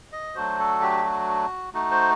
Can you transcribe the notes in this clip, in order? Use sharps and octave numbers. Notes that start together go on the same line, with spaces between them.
D#5
F#3 A3 D4 F#4 C5
A4
G4
F#4
A3 D#4 F#4
C5